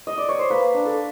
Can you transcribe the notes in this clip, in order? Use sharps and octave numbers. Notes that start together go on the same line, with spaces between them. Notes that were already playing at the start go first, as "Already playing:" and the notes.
D#5
D5
C#5
C5
A#3 B4
D4
A4